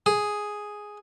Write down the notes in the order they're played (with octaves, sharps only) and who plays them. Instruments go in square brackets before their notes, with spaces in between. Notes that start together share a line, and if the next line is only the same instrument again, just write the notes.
[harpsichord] G#4